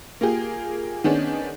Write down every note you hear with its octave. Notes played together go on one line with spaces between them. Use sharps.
A#3 F4 G4 G#4
D#3 B3 C#4 D4 G#4